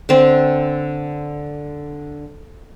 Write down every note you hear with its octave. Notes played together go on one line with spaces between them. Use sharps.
D3 C4